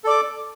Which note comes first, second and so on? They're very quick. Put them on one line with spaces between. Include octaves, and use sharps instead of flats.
A4 D5 D6